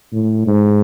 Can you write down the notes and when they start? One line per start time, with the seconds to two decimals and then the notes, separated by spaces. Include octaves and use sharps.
0.13 A2
0.47 G#2